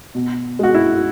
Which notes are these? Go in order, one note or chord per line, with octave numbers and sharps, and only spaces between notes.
B2
G#3 F#4
E4